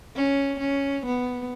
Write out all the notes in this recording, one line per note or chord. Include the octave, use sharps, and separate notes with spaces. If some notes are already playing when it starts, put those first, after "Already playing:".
C#4
C#4
B3